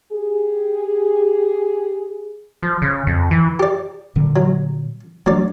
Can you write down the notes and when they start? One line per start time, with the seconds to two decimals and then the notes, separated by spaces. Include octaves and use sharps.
0.13 G4 G#4
2.63 F3
2.82 C#3
3.07 F2
3.31 E3
3.60 G4 D5
4.16 A#2 D3 G3
4.36 F#3
5.26 F#3 A3 D4 D5